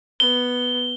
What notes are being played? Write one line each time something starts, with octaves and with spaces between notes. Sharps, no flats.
B3 G7